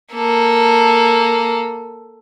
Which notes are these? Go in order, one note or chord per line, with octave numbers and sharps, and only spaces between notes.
A#3 A4